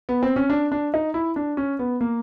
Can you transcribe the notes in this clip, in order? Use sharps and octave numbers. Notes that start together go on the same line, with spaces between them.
B3
C4
C#4
D4
D4
D#4
E4
D4
C#4
B3
A#3